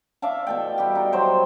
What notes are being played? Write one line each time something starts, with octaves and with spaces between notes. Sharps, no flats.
D5 E5 F5 A5
B2 A4 G5
G3 G4
D#4
F#3 C5 G5